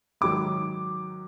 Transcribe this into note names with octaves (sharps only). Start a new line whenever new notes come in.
G#2 D#3 F#3 D6